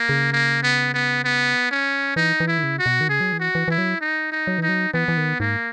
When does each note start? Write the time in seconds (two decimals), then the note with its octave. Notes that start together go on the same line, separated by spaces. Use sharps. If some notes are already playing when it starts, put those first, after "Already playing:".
Already playing: A#3
0.09 C#3
0.32 A#3
0.63 B3
0.94 B3
1.24 B3
1.71 C#4
2.16 E3 D#4
2.40 E3
2.47 E4
2.58 D#3
2.63 C#3
2.79 F#4
2.86 B2
3.01 D#3
3.09 C#3 G#4
3.20 F#3
3.32 E3
3.40 F#4
3.55 E3
3.68 E3 E4
3.78 F#3
4.01 D#4
4.32 D#4
4.47 F#3
4.58 E3 D#4
4.69 F#3
4.93 E3 B3
5.08 E3
5.17 D#3
5.40 G#2 A#3